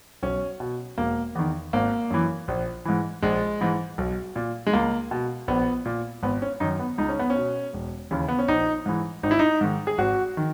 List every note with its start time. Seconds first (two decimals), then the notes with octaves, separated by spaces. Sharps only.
0.23 B1 C#4
0.60 B2
0.98 E1 A#3
1.35 E2 D#3
1.73 G#1 A#3
2.10 F#2 E3
2.48 A#1
2.85 G#2 E3
3.22 A#1 G#3
3.61 G#2 E3
3.98 B1
4.36 A#2
4.66 G#3
4.73 C#2 A#3
5.11 B2
5.48 A#1 B3
5.85 A#2
6.23 G#1 B3
6.42 C#4
6.60 F#2 D#3 D#4
6.79 B3
6.98 C#2 D#4
7.09 C#4
7.19 B3
7.30 C#4
7.36 B2
7.73 E1
8.11 D#2 C#3 E3
8.28 B3
8.39 C#4
8.48 A#1 D#4
8.86 G#2 E3
9.23 G#1 D#4
9.31 E4
9.39 D#4
9.61 G#2 D#3
9.87 G#4
9.98 G#1 F#4
10.37 D#3